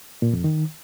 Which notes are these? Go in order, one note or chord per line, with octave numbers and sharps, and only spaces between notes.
A#2
F2
D#3